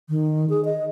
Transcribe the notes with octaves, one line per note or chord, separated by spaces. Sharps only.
D#3
G#4
D#5